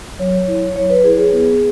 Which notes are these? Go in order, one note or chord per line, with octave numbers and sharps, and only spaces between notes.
F#3 C#5
E4
F#3 C#5
B4
E4 G#4
G#4
B3